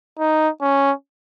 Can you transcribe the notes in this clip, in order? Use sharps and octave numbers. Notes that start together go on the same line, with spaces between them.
D#4
C#4